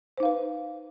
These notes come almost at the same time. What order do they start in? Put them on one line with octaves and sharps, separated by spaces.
C5 D#4 F5 B4